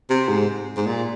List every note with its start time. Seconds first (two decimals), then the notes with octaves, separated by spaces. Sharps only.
0.10 C3
0.29 G#2
0.77 G#2
0.86 A#2